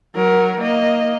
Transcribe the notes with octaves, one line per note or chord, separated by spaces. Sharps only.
F#3 A#4
A#3 D#5